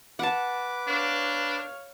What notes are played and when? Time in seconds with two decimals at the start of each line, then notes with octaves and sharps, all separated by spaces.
0.19 B4 F#5 A5 D6
0.87 D4 C#5 F5